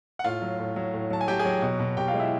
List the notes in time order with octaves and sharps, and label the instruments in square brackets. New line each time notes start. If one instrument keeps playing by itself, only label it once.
[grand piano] F#5
A2 F4 F5
F#3
A2
F#3
A2
F#3 A5
G#5
F#3 G4 G5
G#4 G#5
F#3
B2
B2
B2 G4 G5
F4 F5
G#3
E4 E5